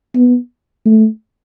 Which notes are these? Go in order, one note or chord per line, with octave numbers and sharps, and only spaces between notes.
B3
A3